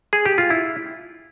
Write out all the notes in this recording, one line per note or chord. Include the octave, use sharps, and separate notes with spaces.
G#4
G4
F4
E4